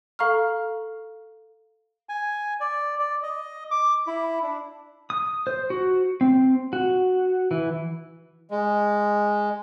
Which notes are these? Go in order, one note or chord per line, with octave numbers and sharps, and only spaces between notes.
A4 F5 A#5 C#6 F6
G#5
D5
D5
D#5
D6
E4
D4
D#6
C5
F#4
C4
F#4
E3
G#3